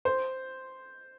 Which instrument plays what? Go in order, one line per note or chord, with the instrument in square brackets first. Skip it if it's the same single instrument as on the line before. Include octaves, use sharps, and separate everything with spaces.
[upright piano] C5